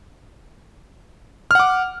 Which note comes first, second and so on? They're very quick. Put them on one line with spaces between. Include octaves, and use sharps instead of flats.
F6 F#5 D6